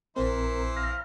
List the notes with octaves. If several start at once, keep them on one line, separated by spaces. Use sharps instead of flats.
A#1 E3 C4 E4 A#4 C5
F5 A#5